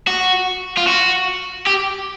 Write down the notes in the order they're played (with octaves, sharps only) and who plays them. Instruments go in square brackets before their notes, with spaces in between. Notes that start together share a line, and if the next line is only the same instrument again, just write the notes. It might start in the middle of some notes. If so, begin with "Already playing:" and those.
[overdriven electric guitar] F#4
F4
F#4
G4